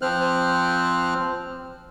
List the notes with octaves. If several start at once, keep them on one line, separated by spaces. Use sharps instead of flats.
F3 C4 C5 F6 F#6